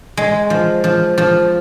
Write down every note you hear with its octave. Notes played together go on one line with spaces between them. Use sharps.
G#3
F3
F3
F3